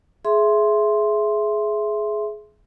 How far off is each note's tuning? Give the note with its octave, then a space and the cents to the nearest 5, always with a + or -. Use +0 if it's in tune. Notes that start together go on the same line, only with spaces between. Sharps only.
G#4 +20 E5 +10 C6 +0